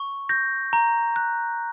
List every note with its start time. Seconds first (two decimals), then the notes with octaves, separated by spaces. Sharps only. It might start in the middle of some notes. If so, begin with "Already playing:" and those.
Already playing: C#6
0.29 G6 A#6
0.73 A#5
1.16 F#6